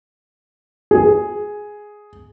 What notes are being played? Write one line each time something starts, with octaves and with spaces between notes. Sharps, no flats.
G#4